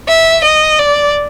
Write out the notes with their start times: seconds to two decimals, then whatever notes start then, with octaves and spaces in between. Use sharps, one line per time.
0.08 E5
0.44 D#5
0.79 D5